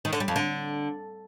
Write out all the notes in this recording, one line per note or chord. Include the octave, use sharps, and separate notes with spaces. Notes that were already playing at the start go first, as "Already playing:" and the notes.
D#3
D3
G3
F2
D3